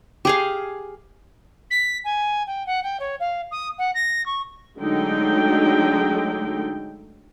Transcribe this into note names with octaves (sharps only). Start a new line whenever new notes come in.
G4 G#4 F5
B6
G#5
G5
F#5
G5
C#5
F5
D#6
F#5
A#6
C#6
D3 F#3 G#3 A3 D#4 G5